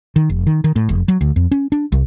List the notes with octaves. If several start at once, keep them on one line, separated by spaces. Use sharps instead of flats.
D#3
F1
D#3
D#3
A2
F1
F#3
D2
F2
C#4
D4
C2